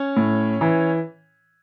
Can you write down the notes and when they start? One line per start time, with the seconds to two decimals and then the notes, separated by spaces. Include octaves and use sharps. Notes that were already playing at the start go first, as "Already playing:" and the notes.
Already playing: C#4 C#5
0.17 A2
0.61 E3